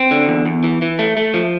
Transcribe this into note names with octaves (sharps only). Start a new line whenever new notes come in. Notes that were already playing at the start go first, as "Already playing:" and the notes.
Already playing: C4
D3
E2
E2
E3
E3
A3
A3
F3